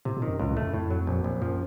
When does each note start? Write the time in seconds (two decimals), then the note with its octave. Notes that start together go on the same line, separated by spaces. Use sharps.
0.05 A2 C3
0.17 A#2
0.22 D#3
0.28 F#2
0.39 C#2 A2
0.51 A2
0.57 A3
0.62 F#2
0.74 F2 A2
0.91 F#3
1.07 A#1
1.24 A#1
1.42 F#2 F3